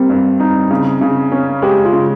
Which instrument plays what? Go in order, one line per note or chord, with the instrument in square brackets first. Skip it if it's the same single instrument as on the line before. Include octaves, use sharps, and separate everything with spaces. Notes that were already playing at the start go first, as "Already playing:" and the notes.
Already playing: [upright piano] G3 A#3 [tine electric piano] C4
[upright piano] G2
D#4
C#3
C#3
C#4
[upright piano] G#3 [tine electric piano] G4
[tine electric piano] F4
[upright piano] C#3